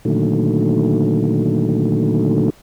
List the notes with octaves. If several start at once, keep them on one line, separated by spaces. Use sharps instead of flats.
A#2 D3 D#3 F#3 A3